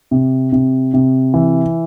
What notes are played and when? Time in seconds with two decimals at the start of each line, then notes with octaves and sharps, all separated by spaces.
0.11 C3
0.52 C3
0.94 C3
1.34 E3